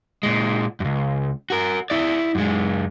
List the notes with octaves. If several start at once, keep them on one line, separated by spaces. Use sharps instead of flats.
A#2 G#3
C#2 F#2
F#4 A#4
E4 D5
F#2 G#3